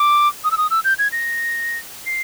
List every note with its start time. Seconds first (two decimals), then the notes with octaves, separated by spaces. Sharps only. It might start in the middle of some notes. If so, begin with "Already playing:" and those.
Already playing: D6
0.44 D#6
0.51 E6
0.58 D#6
0.71 E6
0.84 G6
0.99 G#6
1.12 A#6
2.06 C7